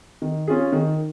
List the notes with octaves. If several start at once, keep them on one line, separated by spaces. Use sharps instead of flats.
D#3
C#4 F4 G#4
D#3